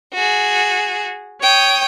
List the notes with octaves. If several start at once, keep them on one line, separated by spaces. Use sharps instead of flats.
F#4 G#4
C#5 G5 D#6